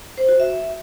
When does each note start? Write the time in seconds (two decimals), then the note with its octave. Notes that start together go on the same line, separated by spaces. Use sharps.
0.17 C5
0.29 F#4
0.40 E5